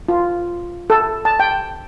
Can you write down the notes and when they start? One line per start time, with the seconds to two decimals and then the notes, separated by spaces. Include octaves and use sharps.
0.09 F4
0.90 A4
1.25 A5
1.40 G5